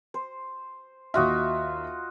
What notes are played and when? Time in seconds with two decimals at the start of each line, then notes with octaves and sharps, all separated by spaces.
0.14 C5
1.14 D#2 F4 F#4 D#5 E5